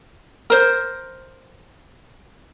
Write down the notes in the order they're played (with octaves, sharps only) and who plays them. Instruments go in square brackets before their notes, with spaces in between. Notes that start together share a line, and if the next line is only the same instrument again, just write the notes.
[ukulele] A#4 C5